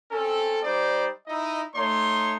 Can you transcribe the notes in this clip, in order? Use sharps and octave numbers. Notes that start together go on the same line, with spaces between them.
C4 C#4 A4
G3 D#4 C5 D5
D#4 E4 D#5
A3 D#4 C#5 C6